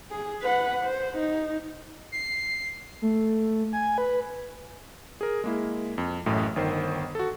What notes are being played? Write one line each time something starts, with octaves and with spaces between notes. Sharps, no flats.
G#4
B4 F#5
C5
D#4
C7
A3
G#5
B4
G#4 A#4
G#3 A#3 E4
F2
A1 F#2 A2
G1 D#3 C5 C7
F#4 A4